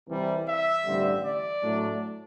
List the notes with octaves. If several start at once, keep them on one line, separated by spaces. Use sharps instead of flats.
C2 C3 E3 G3
E5
A1 G2 D3 G3 C4
D5
A2 F#3 A3 D4